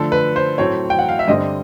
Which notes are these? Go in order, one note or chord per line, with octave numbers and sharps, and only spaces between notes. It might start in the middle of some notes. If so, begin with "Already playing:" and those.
Already playing: D3 F3 A3 A4
B4
C5
A2 F#3 A3 C4 C#5
G5
F#5
F5
E5
G2 D3 G3 C4 D#5